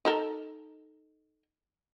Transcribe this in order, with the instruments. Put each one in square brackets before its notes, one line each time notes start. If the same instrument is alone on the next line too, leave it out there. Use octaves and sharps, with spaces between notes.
[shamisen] D#4 A4 A#4